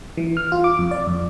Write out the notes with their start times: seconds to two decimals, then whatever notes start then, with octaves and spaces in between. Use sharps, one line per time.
0.17 E3
0.37 F6
0.52 F4
0.64 D6
0.79 F2
0.91 D5
1.07 F2